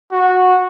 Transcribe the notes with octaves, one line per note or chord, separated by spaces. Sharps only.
F#4